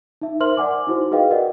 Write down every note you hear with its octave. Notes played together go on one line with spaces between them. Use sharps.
D#4 E5
A#4 C5 E5 C6 F6 F#7
D5 F#5 G#5 D6
D#4 E4 F#4 C5
F#4 G#4 B4 D#5 F5 G5
F#4 A#4 D5 D#5 F#5